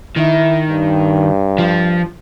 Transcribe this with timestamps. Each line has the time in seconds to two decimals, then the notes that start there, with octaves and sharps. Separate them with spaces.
0.17 D#3 E4
0.69 G2
1.58 F3